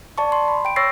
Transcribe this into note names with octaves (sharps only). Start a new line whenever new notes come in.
D5 A5 C#6
C6
B5
G5 D7
C#5 C#6 E6 A6 A#6 C7